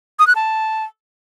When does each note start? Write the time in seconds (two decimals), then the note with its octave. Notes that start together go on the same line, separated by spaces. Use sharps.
0.19 D#6
0.27 F#6
0.35 A5